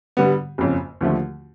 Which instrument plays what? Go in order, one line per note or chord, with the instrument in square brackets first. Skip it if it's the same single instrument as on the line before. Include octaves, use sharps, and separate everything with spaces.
[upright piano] D3 G3 B3
F#1 F2 C#3
D#2 D3 F3 A3